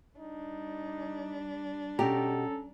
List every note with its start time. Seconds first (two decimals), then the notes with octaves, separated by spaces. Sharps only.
0.19 G3 D4 D#4
1.99 B2 C#4 G4 A4 A#5